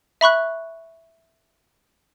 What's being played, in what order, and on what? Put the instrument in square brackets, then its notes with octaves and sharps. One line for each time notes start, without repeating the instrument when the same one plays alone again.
[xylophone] E5 B5 C#6 F#6